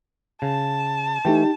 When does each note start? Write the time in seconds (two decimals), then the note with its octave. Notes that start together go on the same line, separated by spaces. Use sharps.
0.42 C#3 A5
1.25 E3 A3 D#4 G4 G5